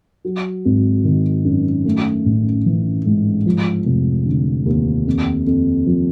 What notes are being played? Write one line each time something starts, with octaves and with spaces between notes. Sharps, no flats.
F#3
G#1
D#3
F#2
A3
A1
E3
G#2
F3
F1
D3
D#2
F2
F2
F3